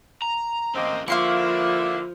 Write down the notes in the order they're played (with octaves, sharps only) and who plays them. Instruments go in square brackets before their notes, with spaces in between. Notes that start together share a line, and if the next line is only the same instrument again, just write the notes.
[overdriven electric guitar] A#5
[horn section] A#3 C4 [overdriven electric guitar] C#4 E4 [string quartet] D#5
[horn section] D3 A#3 [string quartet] F3 [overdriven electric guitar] E4 [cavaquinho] F5 C6 C#6